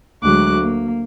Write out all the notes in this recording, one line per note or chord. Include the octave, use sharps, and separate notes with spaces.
D2 F#3 G#3 F#4 D6 F#6
A#3